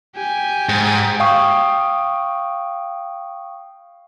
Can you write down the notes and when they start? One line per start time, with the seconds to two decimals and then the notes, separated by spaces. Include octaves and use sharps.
0.16 G4 G#5
0.69 G#2
1.20 F5 G5 C#6 D#6